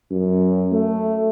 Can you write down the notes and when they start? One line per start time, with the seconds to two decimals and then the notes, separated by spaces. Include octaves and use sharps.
0.11 F#2
0.72 A3